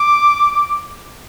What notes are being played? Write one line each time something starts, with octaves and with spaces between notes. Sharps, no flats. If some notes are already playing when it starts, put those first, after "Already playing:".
Already playing: D6